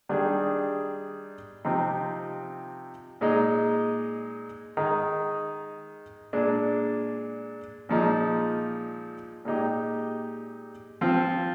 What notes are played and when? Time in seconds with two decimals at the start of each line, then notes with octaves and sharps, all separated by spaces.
0.09 D#3 G3 D4 G#4
1.65 C3 F3 C4 D#4
3.21 A#2 G#3 D#4
4.77 D#3 G#3 D#4
6.33 A#2 G#3 D4
7.89 A#2 F3 G#3 D#4
9.45 A#2 G#3 D#4 G4
11.01 F3 C4 F4